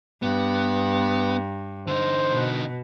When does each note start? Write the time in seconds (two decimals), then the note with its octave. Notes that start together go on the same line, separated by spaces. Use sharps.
0.23 G2 B3
1.88 D3 D#4 C5
2.32 B2